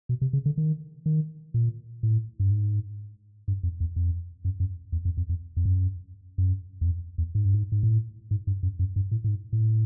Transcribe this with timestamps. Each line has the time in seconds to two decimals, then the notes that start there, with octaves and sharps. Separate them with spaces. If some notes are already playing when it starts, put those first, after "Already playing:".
0.09 B2
0.22 C3
0.33 C#3
0.46 D3
0.58 D#3
1.06 D#3
1.54 A#2
2.03 A2
2.40 G2
2.51 G#2
3.48 G2
3.63 F2
3.80 E2
3.96 F2
4.45 F#2
4.60 F#2
4.92 E2
5.05 F2
5.17 F2
5.29 F2
5.57 F2
5.65 F#2
6.38 F#2
6.81 E2
6.86 F2
7.18 E2
7.35 G#2
7.45 G2
7.55 G#2
7.72 G#2
7.83 A2
8.31 G#2
8.47 G2
8.63 F#2
8.79 F#2
8.96 G2
9.11 A2
9.24 A2
9.28 G#2
9.53 A2